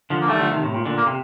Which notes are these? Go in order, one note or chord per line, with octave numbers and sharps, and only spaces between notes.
D3 F3
A#3
D#3 G3 A3
D3 F3
C3 D#3
A2 C3
A#2
A#2 D3
A#3
C3